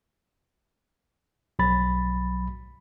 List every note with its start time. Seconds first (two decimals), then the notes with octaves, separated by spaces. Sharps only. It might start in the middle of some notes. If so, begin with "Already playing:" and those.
1.59 B1 F#3 B5 A6